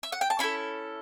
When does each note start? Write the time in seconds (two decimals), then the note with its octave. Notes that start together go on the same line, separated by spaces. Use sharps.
0.03 E5
0.12 F#5
0.21 G5
0.30 A5
0.39 C#4 E4 A4 B5